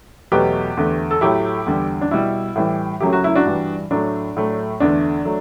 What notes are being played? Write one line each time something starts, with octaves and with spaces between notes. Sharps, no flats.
E2 B2 F#3 A3 G4 B4
E2 D3 A3
A4
A2 F#3 A3 E4 G4
E2 D3 G3
D4
B2 G3 E4
A2 E3 G3
F#2 C#3 F#3 A3 G4
F#4
E4
D4 F#4
G2 E3 G3
A2 F#3 A3 D4
A2 F#3 A3
E2 D3 A3 D4
F#3 A3